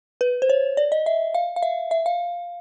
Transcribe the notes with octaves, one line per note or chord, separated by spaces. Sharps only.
B4
C5
C#5
D5
D#5
E5
F5
F5
E5
E5
F5